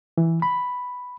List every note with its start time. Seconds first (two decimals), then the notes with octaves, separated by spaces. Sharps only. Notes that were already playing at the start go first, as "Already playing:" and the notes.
0.18 E3
0.42 B5